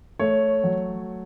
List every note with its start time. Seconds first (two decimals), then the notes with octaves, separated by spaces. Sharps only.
0.19 A3 C#5
0.64 F#3